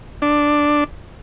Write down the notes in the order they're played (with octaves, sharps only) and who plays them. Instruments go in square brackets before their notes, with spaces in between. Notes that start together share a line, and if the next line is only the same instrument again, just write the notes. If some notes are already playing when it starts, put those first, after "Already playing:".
[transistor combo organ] D4